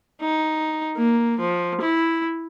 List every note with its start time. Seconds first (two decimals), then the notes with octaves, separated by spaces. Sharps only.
0.22 D#4
0.97 A#3
1.40 F3
1.81 E4